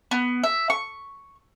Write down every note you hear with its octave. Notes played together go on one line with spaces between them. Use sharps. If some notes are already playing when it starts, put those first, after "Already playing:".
B3
E5
C#6